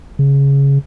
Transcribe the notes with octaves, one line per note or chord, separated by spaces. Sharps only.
C#3